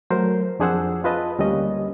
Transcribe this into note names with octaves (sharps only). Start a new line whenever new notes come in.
F#3 A3 A#4 C5
F2 D4 G#4 C5 F#5 E6
F4 B4 D#5 A5
D2 G3 A#3 C#4 D#5